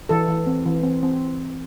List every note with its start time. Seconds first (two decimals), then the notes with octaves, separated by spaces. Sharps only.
0.09 E3 A4
0.28 E3
0.47 C4
0.66 E3
0.83 C4
1.03 C4